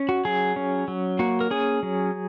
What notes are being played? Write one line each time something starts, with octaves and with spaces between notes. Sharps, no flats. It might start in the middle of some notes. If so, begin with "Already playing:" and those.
Already playing: C#4
F#4
F#3 G#4
C#4
F#3
A#3 F#4
A#4
C#4 G#4
F#3